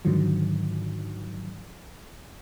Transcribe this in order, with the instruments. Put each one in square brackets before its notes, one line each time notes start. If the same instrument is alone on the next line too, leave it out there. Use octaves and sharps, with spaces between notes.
[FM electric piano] G#2 D3 D#3 F3 F#3